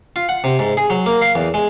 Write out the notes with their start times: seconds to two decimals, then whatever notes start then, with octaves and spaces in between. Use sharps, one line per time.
0.16 F4
0.29 F#5
0.44 C3
0.59 G#2
0.77 G#4
0.90 F#3
1.06 A#3
1.21 F5
1.35 E2
1.54 G#3